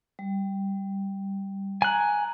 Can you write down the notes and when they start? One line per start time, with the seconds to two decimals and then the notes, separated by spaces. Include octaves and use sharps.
0.19 G3
1.82 G#5 A#5 F#6